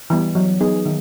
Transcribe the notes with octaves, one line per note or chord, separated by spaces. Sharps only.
E3 G3 B3
F#3
B3 D#4 G#4
D#3